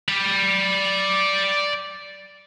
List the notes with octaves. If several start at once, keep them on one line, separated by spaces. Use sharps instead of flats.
D5 B5